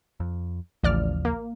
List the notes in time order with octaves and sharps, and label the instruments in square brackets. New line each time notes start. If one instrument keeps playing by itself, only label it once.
[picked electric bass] F2
[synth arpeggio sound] A1 D5 F6 [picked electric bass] D#2 C#3 F3
[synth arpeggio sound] A#3